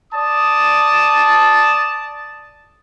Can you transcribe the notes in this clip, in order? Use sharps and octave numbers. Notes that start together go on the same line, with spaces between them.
D5 A5 D#6